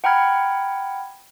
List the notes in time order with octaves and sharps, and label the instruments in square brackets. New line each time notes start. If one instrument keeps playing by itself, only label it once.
[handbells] F#5 G5 A#5 B5 F6 G#6